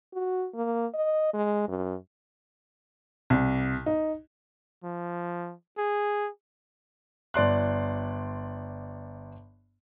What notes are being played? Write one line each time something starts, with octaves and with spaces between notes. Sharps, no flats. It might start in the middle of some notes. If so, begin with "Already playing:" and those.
F#4
A#3
D#5
G#3
F#2
C2
D#4
F3
G#4
G1 D5 C6 F#6